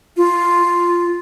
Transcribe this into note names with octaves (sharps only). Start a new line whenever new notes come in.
F4